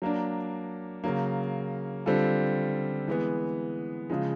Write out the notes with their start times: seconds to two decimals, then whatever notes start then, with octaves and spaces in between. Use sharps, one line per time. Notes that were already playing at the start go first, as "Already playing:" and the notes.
0.02 F#3 A#3 D4
1.04 C#3 F#3 A#3
2.06 D3 G3 C4 F4 A4
3.08 E3 G#3 B3
4.10 C#3 F3 G#3